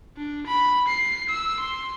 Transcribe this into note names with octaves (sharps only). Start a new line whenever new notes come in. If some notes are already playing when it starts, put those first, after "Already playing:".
D4
B5
C7
E6
C6